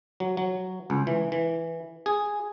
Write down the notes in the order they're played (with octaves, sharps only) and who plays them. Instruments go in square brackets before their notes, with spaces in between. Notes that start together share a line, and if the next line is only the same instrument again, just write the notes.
[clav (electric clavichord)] F#3
F#3
C#2
E3
E3
G#4